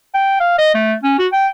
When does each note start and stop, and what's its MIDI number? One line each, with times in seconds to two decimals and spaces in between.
0.14 0.37 79
0.40 0.53 77
0.58 0.72 75
0.75 0.94 57
1.03 1.14 61
1.19 1.27 66
1.33 1.48 79